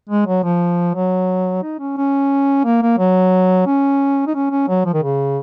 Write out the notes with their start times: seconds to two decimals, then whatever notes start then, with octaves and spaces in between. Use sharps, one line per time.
0.09 G#3
0.27 F#3
0.44 F3
0.95 F#3
1.63 D#4
1.79 C#4
1.97 C#4
2.65 A#3
2.82 A#3
2.98 F#3
3.67 C#4
4.27 D#4
4.35 C#4
4.51 C#4
4.68 F#3
4.85 F3
4.94 D#3
5.03 C#3